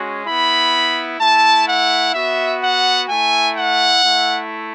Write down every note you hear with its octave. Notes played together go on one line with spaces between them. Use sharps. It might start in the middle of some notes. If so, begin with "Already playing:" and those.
Already playing: G#3 C#4 F#4
B3 E4 B5
A3 E4 A5
F#5
B3 F#4 E5
F#5
A3 E4 G#5
F#5
A3 E4